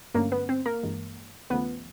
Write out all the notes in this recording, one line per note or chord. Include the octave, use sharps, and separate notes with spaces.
G2 D3 F#3 A3 A#3 C#4 A#4
B3 B4
C4 C5
A#3 A#4
G2 E3 G#3
D#2 C#3 F3 A3 B3 B4